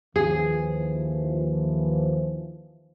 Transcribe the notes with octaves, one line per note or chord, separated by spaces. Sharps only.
D#2 E3 F3 G#4